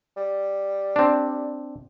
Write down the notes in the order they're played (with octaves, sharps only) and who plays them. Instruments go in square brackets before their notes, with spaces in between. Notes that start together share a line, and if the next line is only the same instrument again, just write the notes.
[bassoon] G3
[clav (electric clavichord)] C4 D4